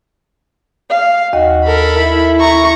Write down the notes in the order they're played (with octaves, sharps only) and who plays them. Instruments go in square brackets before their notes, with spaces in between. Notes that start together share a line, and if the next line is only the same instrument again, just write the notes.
[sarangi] F5
[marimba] D#2 D#5 [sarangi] F#4
[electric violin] A4 B5 [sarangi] A#4
[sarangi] E4
[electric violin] A#5 C#6